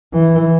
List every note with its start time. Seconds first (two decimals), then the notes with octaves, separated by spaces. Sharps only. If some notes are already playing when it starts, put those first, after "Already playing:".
0.14 E3